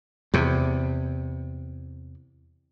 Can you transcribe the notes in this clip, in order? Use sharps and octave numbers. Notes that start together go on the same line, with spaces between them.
E2 C3